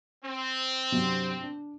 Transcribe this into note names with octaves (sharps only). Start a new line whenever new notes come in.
C4
G2 C3 F#3
D4